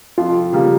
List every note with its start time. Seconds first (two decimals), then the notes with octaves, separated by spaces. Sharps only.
0.18 F2 F4
0.53 C#3 G3 A#3